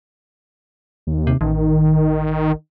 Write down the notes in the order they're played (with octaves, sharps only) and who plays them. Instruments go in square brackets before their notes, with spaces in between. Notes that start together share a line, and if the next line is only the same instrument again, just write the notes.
[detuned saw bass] D#2
[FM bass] C3
[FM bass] A1 [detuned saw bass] D#3